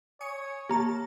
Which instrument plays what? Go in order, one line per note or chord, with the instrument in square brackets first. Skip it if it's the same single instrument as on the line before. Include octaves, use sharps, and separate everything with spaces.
[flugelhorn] C#5 [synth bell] G#5 D#6 C#7
[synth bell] A#3 A5 [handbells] G4 A#5